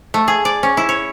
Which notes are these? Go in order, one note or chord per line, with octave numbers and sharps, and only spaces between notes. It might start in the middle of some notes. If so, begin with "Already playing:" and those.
A3
G#4
D5
C#4
E4
C#5